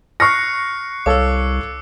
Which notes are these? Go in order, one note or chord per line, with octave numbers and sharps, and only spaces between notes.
C#6 F6 F#6 A#6 C7 C#7
C2 A4 C#5 F5 D6 E6